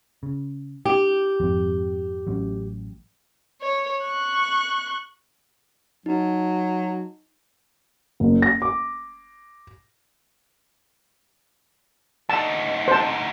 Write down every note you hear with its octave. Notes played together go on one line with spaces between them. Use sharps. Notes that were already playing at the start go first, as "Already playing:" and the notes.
C#3
D4 G4
G#1 F2 C4
A1 F#3 C#4
C#5
C#6 F#6
F#3 D#4
F#1
A#6
D6
D2 D#4 A5
C5 A5